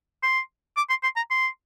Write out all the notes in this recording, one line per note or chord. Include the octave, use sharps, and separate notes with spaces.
C6
D6
C6
C6
A#5
C6